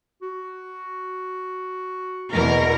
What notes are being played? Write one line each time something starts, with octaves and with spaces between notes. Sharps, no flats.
F#4
E2 B2 A#4